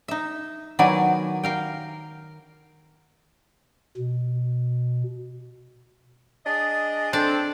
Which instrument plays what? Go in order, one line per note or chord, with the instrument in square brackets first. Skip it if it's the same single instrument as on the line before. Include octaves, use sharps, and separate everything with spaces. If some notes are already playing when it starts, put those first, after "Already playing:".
[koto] D#4 E5
D#3 F#3 B3 E4 D5 G#5
A#4 F5 G5
[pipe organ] B2
[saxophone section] D4 G#4 D#5
[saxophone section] C4 A4 [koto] D4 D5